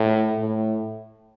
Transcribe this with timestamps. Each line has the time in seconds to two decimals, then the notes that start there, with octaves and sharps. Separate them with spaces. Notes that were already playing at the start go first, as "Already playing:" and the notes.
Already playing: A2
0.38 A2